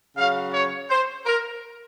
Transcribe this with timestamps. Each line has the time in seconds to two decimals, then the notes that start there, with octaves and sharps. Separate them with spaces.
0.17 C#3 F#3 F5
0.53 C#5
0.90 C5
1.26 A#4